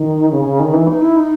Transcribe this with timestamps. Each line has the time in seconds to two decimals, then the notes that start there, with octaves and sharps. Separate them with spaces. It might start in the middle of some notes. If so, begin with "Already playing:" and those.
Already playing: D#3
0.31 C#3
0.45 C#3
0.60 D#3
0.73 E3
0.87 D#4
1.02 E4
1.16 D#4